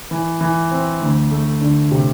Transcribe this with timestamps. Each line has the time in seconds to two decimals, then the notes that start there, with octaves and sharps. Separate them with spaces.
0.11 E3
0.41 E3
0.71 C4
1.01 D2
1.31 A3
1.61 D3
1.91 C3